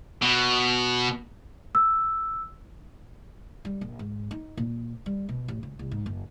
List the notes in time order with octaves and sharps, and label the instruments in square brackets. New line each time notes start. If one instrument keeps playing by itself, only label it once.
[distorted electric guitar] B2
[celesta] E6
[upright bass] G3
A#1
G#2
D#4
A#2
G3
B2
A1
C#2
C2
G#2
F#1